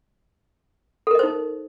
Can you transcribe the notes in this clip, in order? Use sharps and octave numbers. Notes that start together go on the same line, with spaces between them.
D#4 A4 A#4 C5 D#5